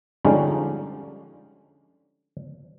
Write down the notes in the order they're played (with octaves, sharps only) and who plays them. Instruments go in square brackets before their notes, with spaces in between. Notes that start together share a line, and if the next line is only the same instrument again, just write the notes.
[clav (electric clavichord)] D3 F3 G3 G#3 C#4 D#4